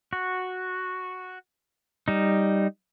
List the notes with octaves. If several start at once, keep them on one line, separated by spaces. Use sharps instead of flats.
F#4
G3 D#4